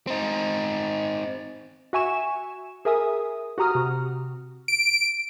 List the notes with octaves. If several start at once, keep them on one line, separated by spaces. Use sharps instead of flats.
C4 D#4
F#4 E5 G#5 C#6 E7
G#4 A#4 E5 G#5 D#6
F#4 G4 A#5 D#6 F6
C3 F#4
D7